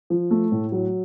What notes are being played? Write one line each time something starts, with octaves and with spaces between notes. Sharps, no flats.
F3
A3
A2
F#3